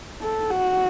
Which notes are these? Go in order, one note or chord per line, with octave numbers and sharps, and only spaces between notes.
A4
F#4